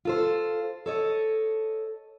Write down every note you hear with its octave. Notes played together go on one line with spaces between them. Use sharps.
F4 A4 C5
A4 C#5 D#5